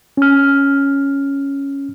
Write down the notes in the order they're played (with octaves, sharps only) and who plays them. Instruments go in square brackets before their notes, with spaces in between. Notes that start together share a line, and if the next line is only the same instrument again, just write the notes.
[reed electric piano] C#4 F6